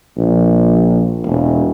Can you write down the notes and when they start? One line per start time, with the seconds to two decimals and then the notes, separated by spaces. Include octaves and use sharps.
0.17 A#1
1.26 E1